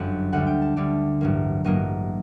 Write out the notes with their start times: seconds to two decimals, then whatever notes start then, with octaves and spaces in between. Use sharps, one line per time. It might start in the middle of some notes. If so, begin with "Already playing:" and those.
Already playing: G1 F#2 F#3 F#5
0.32 D2 D3 G3 F#5
0.47 G5
0.62 A5
0.76 D2 D3 G3 D5
1.21 A1 G2 F#3 A#3
1.64 A1 G2 F#3 A#3 D#5